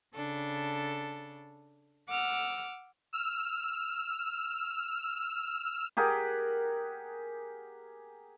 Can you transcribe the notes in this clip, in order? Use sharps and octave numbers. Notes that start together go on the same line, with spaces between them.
C#3 D4 A4
F#5 D6 E6 F6
E6 F6
G4 G#4 A#4 F#5